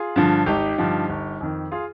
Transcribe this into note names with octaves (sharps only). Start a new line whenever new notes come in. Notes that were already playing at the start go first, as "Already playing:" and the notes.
Already playing: F4 G#4
G2 D3 F3
G#1 D#4 G4
G2 D3 F3
G1
F2 D#3
F4 G#4